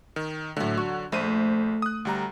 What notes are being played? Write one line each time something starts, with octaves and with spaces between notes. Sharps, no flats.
D#3
D2 A2 D3 F#3
F#4
A#1 A3 C5 D#7
D#6 F#6
D2 G3 A#5